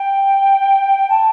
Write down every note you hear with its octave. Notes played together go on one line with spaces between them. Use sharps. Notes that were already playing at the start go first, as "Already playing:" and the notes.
Already playing: G5
A5